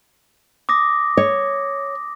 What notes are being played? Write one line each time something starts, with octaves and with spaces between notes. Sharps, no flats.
D6 D#6 A#6
C#5